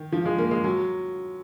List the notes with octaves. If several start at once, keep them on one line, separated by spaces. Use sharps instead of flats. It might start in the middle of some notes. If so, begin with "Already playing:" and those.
Already playing: D#3
F3
G#3
A#3
G#3
F#3